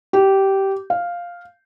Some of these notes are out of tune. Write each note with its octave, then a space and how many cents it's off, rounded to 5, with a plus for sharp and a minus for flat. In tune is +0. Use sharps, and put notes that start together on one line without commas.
G4 -15
F5 +0